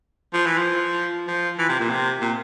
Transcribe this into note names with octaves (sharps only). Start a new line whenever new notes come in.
F3
E3
F3
F3
E3
C3
A#2
C3
A#2